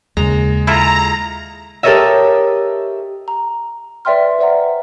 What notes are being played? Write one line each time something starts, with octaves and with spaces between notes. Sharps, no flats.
D#2 C#3 G#3 A#5
E4 F4 A4 A#5
G4 A4 A#4 C#5 D#5 E5
A#5
B4 D5 E5 G5 C6 F6
B4 C5 D5 E5 F#5 A#5